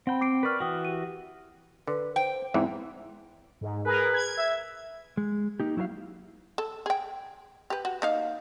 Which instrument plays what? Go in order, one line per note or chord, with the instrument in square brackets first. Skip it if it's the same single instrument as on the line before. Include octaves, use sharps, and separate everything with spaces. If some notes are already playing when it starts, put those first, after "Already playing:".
[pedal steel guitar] C4 G5 [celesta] F#5 B5
[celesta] D6 C7 D7
[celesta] A#4 C#6 F6 [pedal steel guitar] B4 D5
[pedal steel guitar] E3 F#4 [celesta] G5 D#6
[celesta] G4 D#7
[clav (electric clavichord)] D3 [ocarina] B4
[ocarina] C5 [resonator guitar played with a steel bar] G5
[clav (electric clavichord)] E2 G#2 E3 [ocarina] C4
[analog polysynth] G#2
[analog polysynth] G#4 A#4 [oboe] B4
[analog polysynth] G#6
[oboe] E5
[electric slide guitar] G#3
A#3 D#4 G4
F#3 E4 F#4 A#4 F5
[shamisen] A4
G#4 G5
G4 B4
F#4
A#3 D#4 F5